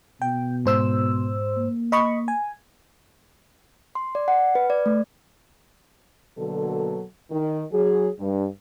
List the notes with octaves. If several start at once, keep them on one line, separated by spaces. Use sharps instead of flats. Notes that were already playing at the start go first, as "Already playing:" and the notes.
B2 G5
G#2 C5 E6
A#3
D#5 B5 C#6
G#5
C6
D5
F#5
B4
D5
A3
B2 D3 F#3 A#3 A4
D#3
F#3 G#4
G2